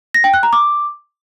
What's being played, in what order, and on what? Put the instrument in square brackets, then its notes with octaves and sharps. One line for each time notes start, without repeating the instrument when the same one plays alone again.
[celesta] A#6
G5
F#6
A#5
D6